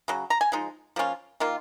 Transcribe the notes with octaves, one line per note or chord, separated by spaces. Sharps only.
C#3 F#3
A#5
G#5
F3 G#3 D#4
F3 A#3 C#4 F4
D#3 A#3 F4